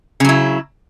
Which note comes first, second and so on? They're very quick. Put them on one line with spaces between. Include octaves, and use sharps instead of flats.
C#3 F#3 E4